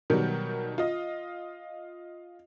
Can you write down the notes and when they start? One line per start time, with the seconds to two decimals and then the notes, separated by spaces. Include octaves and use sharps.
0.10 B2 D#3 F#3 G3
0.78 F4 D#5